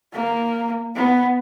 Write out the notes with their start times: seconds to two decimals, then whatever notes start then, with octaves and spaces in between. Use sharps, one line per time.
0.13 A#3
0.95 B3